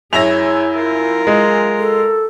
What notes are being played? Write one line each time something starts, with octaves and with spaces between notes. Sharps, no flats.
F#2 E4 G#4 C#5 E5 A#6 F7
F4 A#4
G#3
A4